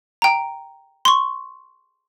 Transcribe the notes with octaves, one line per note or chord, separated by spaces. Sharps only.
G5 A#5
C6 C#6